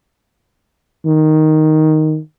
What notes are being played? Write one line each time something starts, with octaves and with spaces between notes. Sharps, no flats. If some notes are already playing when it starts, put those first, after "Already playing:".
D#3